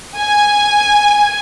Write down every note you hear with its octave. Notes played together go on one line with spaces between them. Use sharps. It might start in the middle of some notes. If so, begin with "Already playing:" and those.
G#5